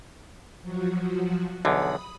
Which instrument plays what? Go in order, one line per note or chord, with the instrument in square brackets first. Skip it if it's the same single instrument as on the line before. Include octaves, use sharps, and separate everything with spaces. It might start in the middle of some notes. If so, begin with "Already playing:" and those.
[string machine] F3 F#3 F#4
[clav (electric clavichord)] B1 E2 D3 [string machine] B5 D#6